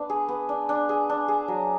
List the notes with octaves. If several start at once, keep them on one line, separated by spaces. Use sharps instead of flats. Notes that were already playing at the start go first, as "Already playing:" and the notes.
Already playing: B3 D4
G#4
B3
D4
D4
G#4
D4
G#4
F#3